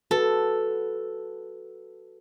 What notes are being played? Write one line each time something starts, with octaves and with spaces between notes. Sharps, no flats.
F#4 A4 B4